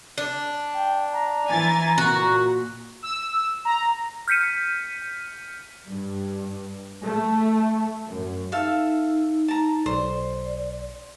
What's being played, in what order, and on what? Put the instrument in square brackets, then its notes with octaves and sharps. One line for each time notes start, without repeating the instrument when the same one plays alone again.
[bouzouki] D4
[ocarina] G5
A#5
[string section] E3 G#5 A6
[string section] A#2 [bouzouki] F#4
[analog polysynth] E6
A#5
[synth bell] F6 G6 B6 C#7 D#7
[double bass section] G2
A3
F#2
[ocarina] D#4 [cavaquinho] A4 E5 F5
[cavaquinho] A5 A#5
[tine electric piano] B1 [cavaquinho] C5 [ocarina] D5
[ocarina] D5